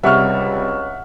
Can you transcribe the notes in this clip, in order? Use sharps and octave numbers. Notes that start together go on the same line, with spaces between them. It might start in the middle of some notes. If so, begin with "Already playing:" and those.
C#2 C3 G3 E5 F#5 C#6 F6